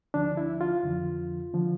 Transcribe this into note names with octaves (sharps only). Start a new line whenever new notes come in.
D2 D3 F3 D4
E4
F4
F2 D3 F3
D3 F3